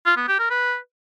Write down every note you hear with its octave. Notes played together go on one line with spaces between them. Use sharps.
F4
B3
G4
A#4
B4